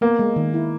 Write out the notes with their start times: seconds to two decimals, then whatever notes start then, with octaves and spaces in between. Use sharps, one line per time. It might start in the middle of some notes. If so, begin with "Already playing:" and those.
0.01 A#3 B3
0.19 G#3
0.36 D#3
0.54 E4